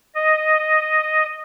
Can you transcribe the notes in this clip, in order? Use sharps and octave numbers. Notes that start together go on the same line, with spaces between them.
D#5